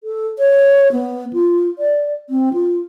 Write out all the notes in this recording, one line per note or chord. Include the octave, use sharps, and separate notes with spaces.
A4
C#5
B3
F4
D5
C4
F4